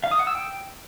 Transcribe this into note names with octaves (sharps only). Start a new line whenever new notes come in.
F5
D#6
F#5
E6
G5